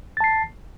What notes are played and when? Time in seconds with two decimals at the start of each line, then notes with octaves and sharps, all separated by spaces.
0.17 A6
0.20 A5
0.24 C7